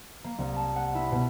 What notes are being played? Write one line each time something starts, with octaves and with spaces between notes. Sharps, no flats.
A#3
C2
A5
F#5
E4
B2